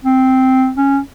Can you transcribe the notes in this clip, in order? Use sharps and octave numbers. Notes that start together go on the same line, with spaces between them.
C4
C#4